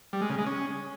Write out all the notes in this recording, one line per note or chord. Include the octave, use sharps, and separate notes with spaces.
G3
G#3
C#3
G#3
C#4